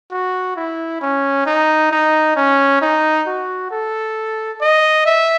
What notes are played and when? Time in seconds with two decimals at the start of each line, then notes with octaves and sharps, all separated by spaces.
0.11 F#4
0.56 E4
1.01 C#4
1.46 D#4
1.91 D#4
2.36 C#4
2.81 D#4
3.27 F#4
3.71 A4
4.61 D#5
5.06 E5